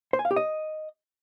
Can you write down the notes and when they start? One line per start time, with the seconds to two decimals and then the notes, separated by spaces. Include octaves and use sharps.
0.13 C5
0.19 G#5
0.25 F5
0.31 G4
0.36 D#5